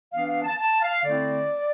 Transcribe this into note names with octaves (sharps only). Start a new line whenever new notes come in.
E3 B3 D4 F5
F5
A5
A5
F5
D3 A3 C4 E4 D5